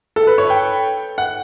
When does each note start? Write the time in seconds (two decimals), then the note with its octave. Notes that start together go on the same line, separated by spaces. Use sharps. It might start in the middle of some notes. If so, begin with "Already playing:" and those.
0.16 A4
0.27 B4
0.38 C#5
0.50 G5
1.18 F#5